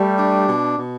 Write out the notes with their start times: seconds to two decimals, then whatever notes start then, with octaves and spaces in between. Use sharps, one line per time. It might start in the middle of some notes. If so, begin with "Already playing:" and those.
Already playing: G3 A3
0.18 D4
0.48 B2
0.78 B2